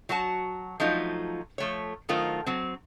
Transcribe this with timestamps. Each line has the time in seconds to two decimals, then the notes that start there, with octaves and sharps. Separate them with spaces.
0.09 F#3 F#4 F#5 A5
0.80 F3 F#3 A3 D#4 F4
1.58 F3 A3 C#5
2.09 D#3 F#3 A3 F4 A#4 C5
2.46 F#3 C4